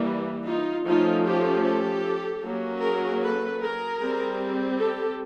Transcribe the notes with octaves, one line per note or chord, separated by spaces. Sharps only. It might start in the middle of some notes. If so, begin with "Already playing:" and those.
Already playing: E3 G3 A#3
D#4 F4
F3 A3 C#4 D#4 F4
F4 G4
G4 A4
F#3 A#3 C#4
G#4 A#4
A4 B4
G#4 A#4
G3 C4
G4 A4